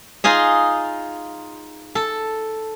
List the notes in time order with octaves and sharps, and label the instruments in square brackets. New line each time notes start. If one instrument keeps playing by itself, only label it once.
[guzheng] D#4 F4 G#4 D#5
A4